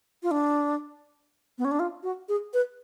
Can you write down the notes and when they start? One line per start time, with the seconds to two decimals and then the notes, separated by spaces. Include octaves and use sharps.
0.23 F4
0.31 D4
1.58 B3
1.64 C#4
1.71 D4
1.79 F4
2.03 F#4
2.28 G#4
2.53 B4